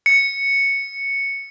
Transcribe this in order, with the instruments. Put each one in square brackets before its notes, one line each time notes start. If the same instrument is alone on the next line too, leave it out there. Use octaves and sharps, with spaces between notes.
[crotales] C#7